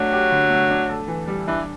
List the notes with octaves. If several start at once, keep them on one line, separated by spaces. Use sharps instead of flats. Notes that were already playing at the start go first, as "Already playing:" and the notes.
Already playing: F#3 A3 D4
G4
D3
A3
D4
A4
E3
G3
E3 D4